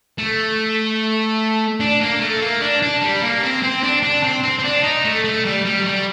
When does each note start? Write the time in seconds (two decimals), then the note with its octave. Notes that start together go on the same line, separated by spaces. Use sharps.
0.18 A3
1.80 D4
2.01 A#3
2.20 A3
2.42 A#3
2.61 D4
2.82 D4
3.02 G3
3.23 A#3
3.43 C4
3.63 C4
3.83 D4
4.03 D4
4.23 C4
4.43 C4
4.59 C4
4.64 D4
4.84 D#4
5.05 A3
5.24 A3
5.45 G3
5.65 G3
5.81 F#3
5.86 G3